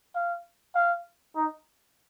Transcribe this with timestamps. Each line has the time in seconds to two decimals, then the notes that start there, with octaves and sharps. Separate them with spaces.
0.15 F5
0.75 F5
1.36 D#4